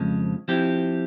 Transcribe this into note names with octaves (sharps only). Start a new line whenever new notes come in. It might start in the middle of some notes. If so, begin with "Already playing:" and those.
Already playing: F2 C#3 F3 G#3
F3 C4 E4 G4